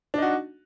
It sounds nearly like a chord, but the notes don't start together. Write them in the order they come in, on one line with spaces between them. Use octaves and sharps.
D4 D#4 F#4